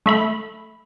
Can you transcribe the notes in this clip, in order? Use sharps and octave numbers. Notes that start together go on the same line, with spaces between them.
A3 E5 B5